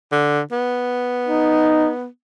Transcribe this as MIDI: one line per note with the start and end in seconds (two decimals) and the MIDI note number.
0.12 0.40 50
0.52 2.06 59
1.28 1.91 63